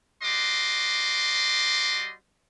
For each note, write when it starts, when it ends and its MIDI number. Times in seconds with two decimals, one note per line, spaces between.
0.23 2.13 55
0.23 2.13 66
0.23 2.13 75
0.23 2.13 84
0.23 2.13 86